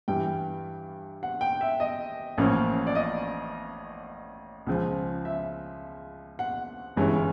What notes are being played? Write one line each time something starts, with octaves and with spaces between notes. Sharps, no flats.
G2 E3 G3 G5
F#5
G5
E5
D#5
A1 A2 F3 A#3 C#4
D5
D#5
C#2 C#3 F3
E5
F#5
G1 G2 E3 G#3 C#4